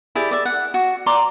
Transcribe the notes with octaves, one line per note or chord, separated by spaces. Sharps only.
E4 G4 G#4 D5
D5 E5
F#5
F#4
D5 A#5 C6 D6